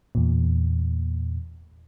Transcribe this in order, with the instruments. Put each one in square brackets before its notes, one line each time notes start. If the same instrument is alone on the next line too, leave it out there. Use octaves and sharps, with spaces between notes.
[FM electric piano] E2 A#2